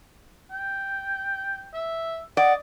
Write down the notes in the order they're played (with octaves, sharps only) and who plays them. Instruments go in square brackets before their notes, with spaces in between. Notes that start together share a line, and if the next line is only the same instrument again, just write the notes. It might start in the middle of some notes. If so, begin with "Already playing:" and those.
[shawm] G5
E5
[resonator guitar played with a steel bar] D5 [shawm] D#5 [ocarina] F#5